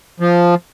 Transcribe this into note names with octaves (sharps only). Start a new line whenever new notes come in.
F3